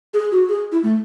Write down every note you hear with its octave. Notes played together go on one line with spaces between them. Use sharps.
G#4
F#4
G#4
E4
A3